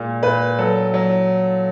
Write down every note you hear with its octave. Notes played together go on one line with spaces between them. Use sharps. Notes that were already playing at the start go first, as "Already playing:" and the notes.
Already playing: A#2 G#3
A#2 B4
F#3 A4
F#3